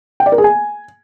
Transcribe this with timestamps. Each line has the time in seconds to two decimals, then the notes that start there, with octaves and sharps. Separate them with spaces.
0.20 G5
0.26 D5
0.32 A#4
0.38 G#4
0.44 G#5